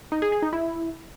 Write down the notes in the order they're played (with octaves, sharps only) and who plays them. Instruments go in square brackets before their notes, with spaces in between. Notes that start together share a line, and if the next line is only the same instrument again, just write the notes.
[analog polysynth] D#4
G#4
G#4
D#4
E4